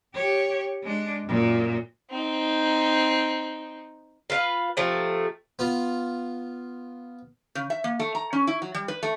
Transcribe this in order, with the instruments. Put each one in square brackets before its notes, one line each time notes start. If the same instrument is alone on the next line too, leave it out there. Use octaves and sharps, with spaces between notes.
[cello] G4 C#5
G#3 D4
F#2 A#2
[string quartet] C4 D#4
[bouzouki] F4 B4 F5
C3 F3 A3
[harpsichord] B3 F4
[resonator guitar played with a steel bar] C#3
E5
A#3
A3
A#5
C#4
E4
F#3
G3
B4
A3